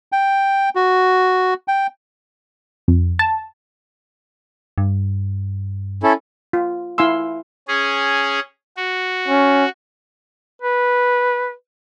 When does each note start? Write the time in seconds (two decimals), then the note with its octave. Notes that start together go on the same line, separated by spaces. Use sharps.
0.12 G5
0.75 F#4
1.68 G5
2.88 F2
3.19 A5
4.78 G2
6.03 C#4 E4 A4
6.53 F4
6.98 E4 F5 G#5 C6 E6
7.68 C#4 G#4
8.77 F#4
9.28 C#4
10.62 B4